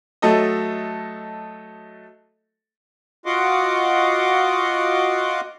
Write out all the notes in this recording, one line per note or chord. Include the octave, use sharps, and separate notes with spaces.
F#3 A3 A4 D#5
F4 F#4 D#5 F#5 C6 D6